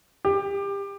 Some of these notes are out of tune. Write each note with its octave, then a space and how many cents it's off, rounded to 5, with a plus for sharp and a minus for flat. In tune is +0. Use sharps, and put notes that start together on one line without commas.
G4 +25